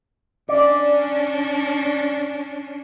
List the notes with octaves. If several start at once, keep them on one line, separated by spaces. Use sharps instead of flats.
C#4 D4 D5